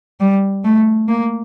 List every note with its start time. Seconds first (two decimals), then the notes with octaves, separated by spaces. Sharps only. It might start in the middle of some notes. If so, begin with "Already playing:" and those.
0.20 G3
0.64 A3
1.09 A#3